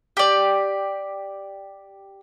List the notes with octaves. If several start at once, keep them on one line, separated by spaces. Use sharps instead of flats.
G4 D5